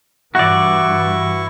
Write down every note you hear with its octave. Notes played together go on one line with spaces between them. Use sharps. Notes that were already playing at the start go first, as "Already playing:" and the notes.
G2 E3 E4 F#4 D5 C#6